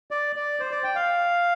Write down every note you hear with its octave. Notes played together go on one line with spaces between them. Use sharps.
D5
D5
C5
D5
G5
F5